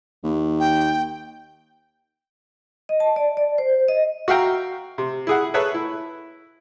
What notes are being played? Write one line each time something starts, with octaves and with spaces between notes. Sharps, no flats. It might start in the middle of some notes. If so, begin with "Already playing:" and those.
D#2
G5
D#5
A5
D5
D5
C5
D#5
F#4 E5 F5 G5 A#5
C3
E4 G#4 F#5
G#4 A4 B4 C#5 E5
E4